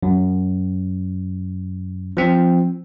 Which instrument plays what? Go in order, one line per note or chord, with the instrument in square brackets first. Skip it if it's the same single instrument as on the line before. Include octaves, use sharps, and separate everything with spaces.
[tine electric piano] F#2
F3 C4